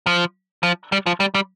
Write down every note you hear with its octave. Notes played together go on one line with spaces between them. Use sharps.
F3
F3
G3
F3
G3
G3